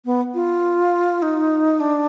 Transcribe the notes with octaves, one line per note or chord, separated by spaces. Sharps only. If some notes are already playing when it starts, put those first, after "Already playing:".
B3
F4
D#4
D4